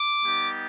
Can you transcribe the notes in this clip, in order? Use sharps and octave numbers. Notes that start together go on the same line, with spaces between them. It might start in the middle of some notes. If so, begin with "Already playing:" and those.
Already playing: D6
G3 B3 D#4 G4